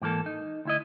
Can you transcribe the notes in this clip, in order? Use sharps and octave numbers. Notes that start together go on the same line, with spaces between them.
G#2 E3 A#3 A4
D#4
D2 E4 D#5